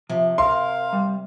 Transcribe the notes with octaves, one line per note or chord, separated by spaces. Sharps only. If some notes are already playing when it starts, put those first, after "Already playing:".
C3 F3
A#4 F5 C6
G3